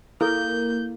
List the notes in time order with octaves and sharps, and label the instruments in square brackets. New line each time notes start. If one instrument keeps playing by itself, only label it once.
[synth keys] A#3 [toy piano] E4 A4 [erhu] G6